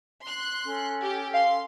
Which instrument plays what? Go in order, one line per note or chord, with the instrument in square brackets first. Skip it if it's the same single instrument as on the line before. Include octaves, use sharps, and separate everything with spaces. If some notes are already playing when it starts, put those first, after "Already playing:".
[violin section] C6 F#6
[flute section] C#4 A4
[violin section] G4
[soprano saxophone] F5 [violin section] C6